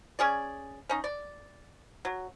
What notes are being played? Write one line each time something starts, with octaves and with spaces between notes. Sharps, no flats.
C#4 G#4 D5
C#4 D#4
D5
F#3